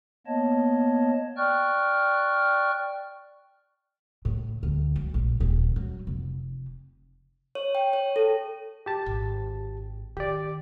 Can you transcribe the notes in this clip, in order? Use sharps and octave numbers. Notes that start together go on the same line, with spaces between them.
A#3 B3 C#5 D#5 A5
D5 G5 C#6 F6 F#6
A2
D2
F#3
A#1
D#1
F#3
F1
C#5
G5
C#5
A4
G4 A5
G#1
D#3 G4 D5